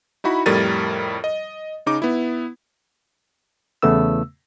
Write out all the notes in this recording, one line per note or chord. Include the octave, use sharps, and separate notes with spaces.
D#4 E4 F#4 B5
F2 A2 G3 A#4 A6 D#7
D#5
C#3 D#4 D6
B3 E4
E2 C#3 A3 B3 E6